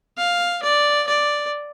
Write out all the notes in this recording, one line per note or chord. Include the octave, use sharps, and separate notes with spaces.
F5
D5
D5